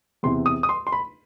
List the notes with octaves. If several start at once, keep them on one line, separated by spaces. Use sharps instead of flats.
E2 C3 E3 C6
D#6
D#6
C6
C6
B5